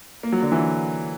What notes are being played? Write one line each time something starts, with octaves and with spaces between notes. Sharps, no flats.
A#3
F#3
D3
E3